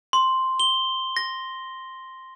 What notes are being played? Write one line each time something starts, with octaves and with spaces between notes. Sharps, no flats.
C6
G7
A#6